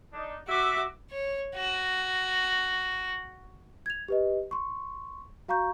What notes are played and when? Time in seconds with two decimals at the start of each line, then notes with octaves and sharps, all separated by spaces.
0.13 D4 D#4
0.48 F#4 E5 D6
1.12 C#5
1.55 F#4
3.86 G#6 F7
4.08 G4 B4 D#5
4.51 C6 C#6
5.48 F#4 F5 A#5 C#6 G6